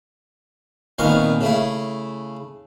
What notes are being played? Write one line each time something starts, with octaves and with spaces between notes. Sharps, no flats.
C2 A#2 D#3 B3 F5 C#6
C#3 A3 E4